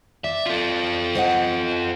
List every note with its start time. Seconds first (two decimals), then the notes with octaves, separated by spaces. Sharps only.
0.24 D5 E5
0.46 F4 A4
1.15 C5 D#5 F#5